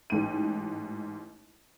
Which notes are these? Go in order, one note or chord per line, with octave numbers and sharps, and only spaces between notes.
A1 G#2 D#7